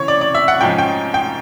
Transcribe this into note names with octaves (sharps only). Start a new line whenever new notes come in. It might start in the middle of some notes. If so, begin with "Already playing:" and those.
Already playing: C#3 E3 C#5
D5
D5
E5
F#5
G#2 F3 G#3 C#4 G5
G5
G5